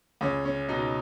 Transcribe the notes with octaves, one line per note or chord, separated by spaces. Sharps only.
C#2 C#4
C#4
B2 D#4